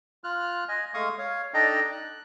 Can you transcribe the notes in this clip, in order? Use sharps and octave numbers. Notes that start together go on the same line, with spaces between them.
F4 F6 F#6
D#5 G#5
G#3 A3 F5 C#6 D#6
C#5 F5
D4 D#4 A4 D#5 G5 A#5
F#6